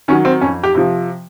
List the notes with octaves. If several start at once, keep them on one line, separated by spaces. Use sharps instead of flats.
D#3 F#3 C#4
C4
F2 C#4
G4
C3 F3